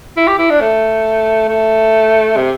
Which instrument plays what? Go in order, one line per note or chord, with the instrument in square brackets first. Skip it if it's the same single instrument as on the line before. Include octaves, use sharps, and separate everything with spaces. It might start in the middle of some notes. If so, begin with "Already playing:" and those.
[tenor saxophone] E4
G4
E4
D4
A3
A3
C3